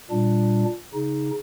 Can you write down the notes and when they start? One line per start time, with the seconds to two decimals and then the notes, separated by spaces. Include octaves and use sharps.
0.11 A#2 G3 D4
0.94 C#3 D#4